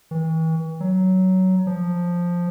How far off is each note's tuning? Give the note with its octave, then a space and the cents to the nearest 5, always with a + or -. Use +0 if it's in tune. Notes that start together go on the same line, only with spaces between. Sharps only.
E3 -40
F#3 +15
F3 +5